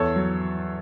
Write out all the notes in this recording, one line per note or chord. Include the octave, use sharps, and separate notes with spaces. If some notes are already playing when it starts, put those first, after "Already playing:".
Already playing: E2 A4 C#5
F#3